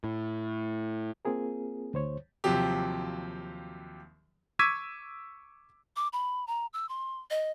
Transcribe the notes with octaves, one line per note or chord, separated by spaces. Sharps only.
A2
A#3 C4 F4 G#4 A#4
D2 C5 C#5
D#2 C3 F3 F#3 G4
C#6 D6 E6 G#6 B6 D#7
D6
B5
A#5
E6
C6
D#5